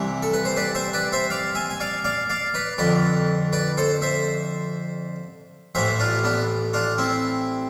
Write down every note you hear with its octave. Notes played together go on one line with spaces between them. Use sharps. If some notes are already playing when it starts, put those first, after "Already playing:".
Already playing: C2 C3 E3
A4
B4
C5
B4 D5
C5 E5
B4 D5
C5 E5
D5 F5
E5 G#5
G#5
D5 F5
D5 F5
D5 F5
B4 D5
F2 D3 B4 D5
B4 D5
A4 C5
C5 E5
A1 A2 E3 C5 E5
D4 F4
B3 D4
D4 F4
C4 E4